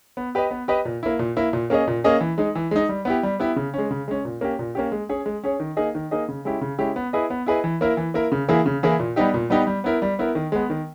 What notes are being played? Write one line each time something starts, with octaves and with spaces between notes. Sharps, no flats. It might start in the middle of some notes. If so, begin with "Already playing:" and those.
B3
G4 B4 D#5
B3
G4 B4 D#5
A#2
A#3 E4
A#2
A#3 E4
A#2
A#3 C#4 G#4 D#5
A#2
A#3 C#4 G#4 D#5
E3
G#3 D#4
E3
G#3 D#4
G3
B3 E4 G4
G3
B3 E4 G4
C#3
G#3 C#4
C#3
G#3 C#4
A#2
A#3 C#4 G4
A#2
A#3 C#4 G4
G#3
C#4 G#4 C#5
G#3
C#4 G#4 C#5
D#3
A#3 D#4 G#4 D#5
D#3
A#3 D#4 G#4 D#5
C#3
G#3 C#4 E4 G4
C#3
G#3 C#4 E4 G4
B3
E4 G#4 B4 D#5
B3
E4 G#4 B4 D#5
E3
A#3 E4 A#4
E3
A#3 E4 A#4
C#3
E3 A#3 E4 G#4
C#3
E3 A#3 E4 G#4
A#2
G3 B3 D#4 G4
A#2
G3 B3 D#4 G4
G3
B3 E4 A#4
G3
B3 E4 A#4
D#3
G#3 B3
D#3